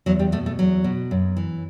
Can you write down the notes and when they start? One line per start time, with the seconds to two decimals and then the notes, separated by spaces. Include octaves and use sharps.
0.06 E2 F#3
0.19 G3
0.32 B2 A3
0.46 A3
0.59 E2 F#3
0.84 B2
1.11 F#2
1.37 E3